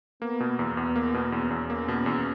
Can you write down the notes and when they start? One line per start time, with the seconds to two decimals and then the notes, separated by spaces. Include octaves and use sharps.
0.22 A#3 B3
0.40 B2
0.59 E2
0.77 E2 B3
0.96 A#3
1.14 B2
1.32 E2 C#4
1.51 E2
1.70 A#3
1.88 B2
2.06 E2